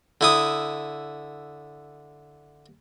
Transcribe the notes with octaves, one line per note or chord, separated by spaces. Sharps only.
D3 E4 D#6